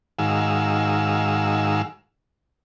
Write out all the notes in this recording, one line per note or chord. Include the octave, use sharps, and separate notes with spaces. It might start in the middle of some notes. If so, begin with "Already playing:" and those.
G#2 D#3 F#4 G#4 F5 E6